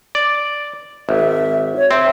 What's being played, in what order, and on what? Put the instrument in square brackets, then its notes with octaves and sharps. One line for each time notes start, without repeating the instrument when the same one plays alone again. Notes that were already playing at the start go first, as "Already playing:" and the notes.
[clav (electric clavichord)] D5
[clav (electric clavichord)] G#1 [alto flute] E5
[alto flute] C#5
[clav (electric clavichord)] C4 [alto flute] E5